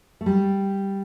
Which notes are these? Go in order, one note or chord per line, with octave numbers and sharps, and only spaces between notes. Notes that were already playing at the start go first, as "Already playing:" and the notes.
A3
G3